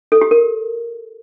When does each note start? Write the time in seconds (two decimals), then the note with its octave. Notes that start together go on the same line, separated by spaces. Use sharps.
0.12 A4
0.21 G4
0.31 A#4